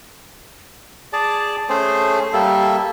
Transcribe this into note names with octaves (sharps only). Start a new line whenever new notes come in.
G#4 D5 A5
A3 C#4 G#4 C5
G3 A#3 A4 E5